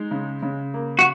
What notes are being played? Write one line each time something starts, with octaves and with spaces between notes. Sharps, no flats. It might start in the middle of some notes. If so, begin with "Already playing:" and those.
Already playing: G#3 D#4
C#3
C#3
A#3
F#4